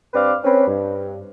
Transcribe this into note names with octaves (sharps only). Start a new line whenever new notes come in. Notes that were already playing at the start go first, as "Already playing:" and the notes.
G2 C4 B4 D5 F5 D6
C4 C#4 B4
G2